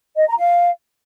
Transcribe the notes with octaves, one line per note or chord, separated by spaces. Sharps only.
D#5
A#5
F5